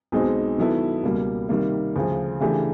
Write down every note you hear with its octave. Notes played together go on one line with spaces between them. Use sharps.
B1 B2 G#3 C4 D#4
D#3 F#3 B3 E4 A4
C#2 B2 G3 A#3
C3 D#3 G3 A#3
D2 C#3 F3
C#3 E3 A3 D4 G4